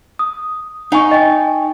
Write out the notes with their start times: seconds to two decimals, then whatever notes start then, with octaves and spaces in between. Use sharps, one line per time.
0.19 D#6
0.92 D#4 F#5 G#5 C#6
1.11 D#5 G5 G#5